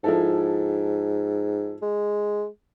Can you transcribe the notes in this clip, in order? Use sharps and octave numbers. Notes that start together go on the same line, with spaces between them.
G#2 F3 E4 A4
G#3